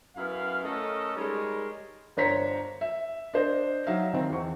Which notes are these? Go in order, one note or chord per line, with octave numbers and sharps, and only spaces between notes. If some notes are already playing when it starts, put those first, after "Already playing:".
F#2 B3 E4 F5
A3 C#4 A4 A#4 D#5
G3 G#3 D#4 A#4 C#5
G1 D4 C5 C#5 A#5 B6
E5
D4 C5 D#5
F#3 D#4 E5 F5
D#3 C4
E2 C#6